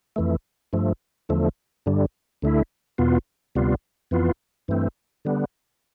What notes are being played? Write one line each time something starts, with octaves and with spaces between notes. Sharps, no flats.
F2 E3 A3
G2 F3 A3
E2 D3 F3 A3
G2 D3 G3
D2 D3 A3 E4
E2 B2 B3 F4
D2 C3 G3 B3 F4
F2 E3 B3 F4
G2 E3 A3 C4
D3 G3 B3